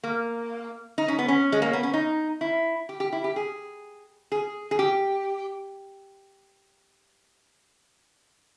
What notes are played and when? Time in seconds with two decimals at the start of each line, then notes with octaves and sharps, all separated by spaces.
0.04 A#3
0.98 D#4
1.08 C#4
1.19 B3
1.28 C#4
1.52 G#3
1.62 A#3
1.73 B3
1.83 C#4
1.94 D#4
2.41 E4
2.89 G4
3.00 G4
3.12 E4
3.24 G4
3.36 G#4
4.32 G#4
4.71 G#4
4.79 G4